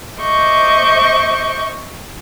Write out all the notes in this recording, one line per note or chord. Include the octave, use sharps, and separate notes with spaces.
C5 D#5 E5 C#6 D6 G6